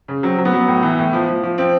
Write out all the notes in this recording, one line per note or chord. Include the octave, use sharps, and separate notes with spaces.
C#3
F#3 C4
F#3
B3
F#3
A2
E3
A2
F3
F3
F3
F3 C4